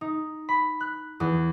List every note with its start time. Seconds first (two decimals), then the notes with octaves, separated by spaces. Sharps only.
0.01 D#4
0.49 B5
0.80 F#6
1.20 E2